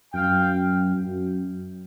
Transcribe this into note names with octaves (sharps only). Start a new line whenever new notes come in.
F#2 F5 G5
F#2